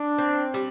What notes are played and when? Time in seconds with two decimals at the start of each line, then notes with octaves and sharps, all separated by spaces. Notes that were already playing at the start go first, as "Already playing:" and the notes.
Already playing: D4
0.18 C4
0.54 G3